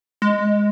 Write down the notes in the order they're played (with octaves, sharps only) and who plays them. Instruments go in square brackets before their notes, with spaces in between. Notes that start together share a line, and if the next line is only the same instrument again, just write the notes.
[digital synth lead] G#3